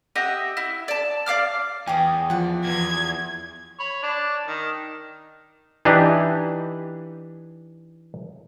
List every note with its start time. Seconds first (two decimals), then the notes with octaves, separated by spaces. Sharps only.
0.15 G4 D#5 E5 F#5
0.57 E4
0.88 D5 A5
1.26 D5 F5 D6 F6
1.87 E2 G5 G#5 D6 D#6
2.30 F3 D5 F#5
2.64 E2 G#6
3.80 C#5 B5
4.03 D4
4.48 D#3
5.85 E3 D4 D#4 G4 B4